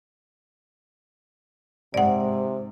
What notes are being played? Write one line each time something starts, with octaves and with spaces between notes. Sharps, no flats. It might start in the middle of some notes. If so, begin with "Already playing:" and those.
G#2 C3 D5 F#5